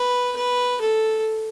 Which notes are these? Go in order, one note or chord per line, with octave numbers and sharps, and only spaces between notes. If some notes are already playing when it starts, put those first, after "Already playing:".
Already playing: B4
B4
A4